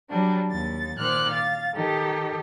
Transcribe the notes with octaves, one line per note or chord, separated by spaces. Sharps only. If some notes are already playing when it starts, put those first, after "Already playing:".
F#3 G3 D4
D#2 A6
A#2 D#3 C5 D6 F6 F#6
F5 A6
D#3 D#4 G4 A4